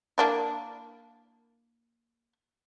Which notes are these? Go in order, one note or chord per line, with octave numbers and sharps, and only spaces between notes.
A#3 D4 E4